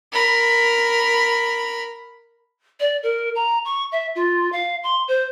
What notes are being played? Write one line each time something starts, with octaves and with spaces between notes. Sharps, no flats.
A#4 B5
D5
A#4
A#5
C#6
E5
F4
F5
C6
C5